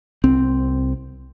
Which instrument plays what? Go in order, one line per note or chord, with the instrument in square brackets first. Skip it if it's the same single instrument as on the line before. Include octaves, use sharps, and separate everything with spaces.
[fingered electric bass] C2 C4